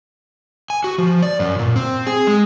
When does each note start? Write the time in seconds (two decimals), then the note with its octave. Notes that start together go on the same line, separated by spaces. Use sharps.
0.70 G#5
0.84 F#4
0.98 F3
1.22 D5
1.39 F#2
1.59 A#2
1.76 C4
2.06 G#4
2.27 G#3